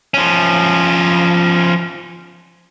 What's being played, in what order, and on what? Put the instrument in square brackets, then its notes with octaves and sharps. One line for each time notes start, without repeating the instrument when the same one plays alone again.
[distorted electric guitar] F3 C#4